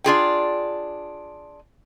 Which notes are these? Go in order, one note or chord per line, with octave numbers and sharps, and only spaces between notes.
D4 F4 G#4 G5